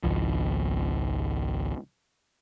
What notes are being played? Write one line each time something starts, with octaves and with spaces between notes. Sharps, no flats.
G#1 C#2 F3